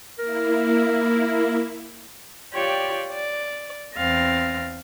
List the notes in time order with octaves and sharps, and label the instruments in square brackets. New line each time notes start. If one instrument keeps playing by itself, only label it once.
[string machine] A#3 E4 [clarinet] A#4
[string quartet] F4 G4 C#5 D5 G5
D5
E2 C4 F5 A6 A#6